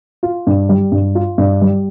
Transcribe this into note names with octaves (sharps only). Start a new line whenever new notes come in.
F4
G2
G3
G2
F4
G2
G3